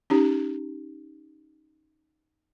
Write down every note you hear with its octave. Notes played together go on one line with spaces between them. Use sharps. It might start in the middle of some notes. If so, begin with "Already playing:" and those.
C#4 D#4 G4